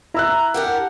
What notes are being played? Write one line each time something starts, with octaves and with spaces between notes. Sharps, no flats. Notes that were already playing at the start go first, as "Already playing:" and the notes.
E4 A#5 E6 F#6
D4 G4 A#4 F#5